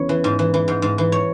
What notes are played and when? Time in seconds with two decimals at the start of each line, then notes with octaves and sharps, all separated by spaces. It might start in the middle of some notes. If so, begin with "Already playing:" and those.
Already playing: E2 C#3 C#5
0.09 E3
0.24 G#2
0.39 E3
0.54 E3
0.68 G#2
0.82 G#2
0.98 E3
1.12 C#5